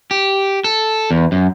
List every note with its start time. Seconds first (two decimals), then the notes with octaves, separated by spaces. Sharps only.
0.11 G4
0.64 A4
1.11 E2
1.32 F#2